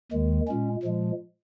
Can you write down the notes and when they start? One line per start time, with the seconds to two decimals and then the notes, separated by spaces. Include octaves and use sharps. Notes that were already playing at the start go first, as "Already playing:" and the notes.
0.12 D#2 D#3 G#3
0.47 A#2 G#3 C#4
0.83 A#2 F3 G#3